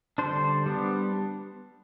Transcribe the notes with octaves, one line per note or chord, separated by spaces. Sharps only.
D3 G3 D4 C5
G3 B3 D4